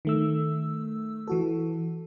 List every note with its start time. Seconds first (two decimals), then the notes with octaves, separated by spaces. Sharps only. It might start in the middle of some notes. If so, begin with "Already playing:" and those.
0.05 D#3 A3 E6
1.28 E3 F#4 A4